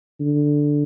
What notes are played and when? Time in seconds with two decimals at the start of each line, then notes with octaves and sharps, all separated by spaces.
0.20 D3